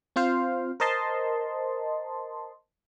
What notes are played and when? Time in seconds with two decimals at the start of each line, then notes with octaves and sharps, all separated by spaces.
0.16 C4 F4 C5 F5
0.80 A#4 C5 D#5 A5 C6